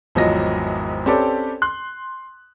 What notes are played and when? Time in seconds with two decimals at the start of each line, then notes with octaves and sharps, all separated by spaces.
0.15 G#1 E2 F3 F#3 D#5 A#6
1.06 C4 C#4 G4 A4 B4 D5
1.62 C6 F#6